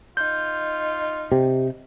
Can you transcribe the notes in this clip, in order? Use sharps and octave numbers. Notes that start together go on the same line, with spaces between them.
D#4 F4 G6
C3 G4